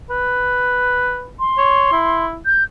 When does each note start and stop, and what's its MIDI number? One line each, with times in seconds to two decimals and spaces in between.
0.10 1.29 71
1.39 2.25 84
1.58 1.89 73
1.92 2.39 64
2.46 2.64 91